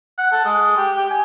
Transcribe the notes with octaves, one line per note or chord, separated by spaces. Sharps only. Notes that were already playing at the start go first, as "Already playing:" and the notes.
F#5
A4
G#3
G4
G4
G#5